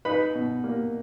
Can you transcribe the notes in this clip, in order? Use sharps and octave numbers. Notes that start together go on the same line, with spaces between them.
D#4 B4 B5
B2
A#3